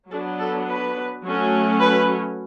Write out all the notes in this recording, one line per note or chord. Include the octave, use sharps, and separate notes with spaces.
F#3 B3 D4 A4
A4
B4
F#3 A3 C#4
B4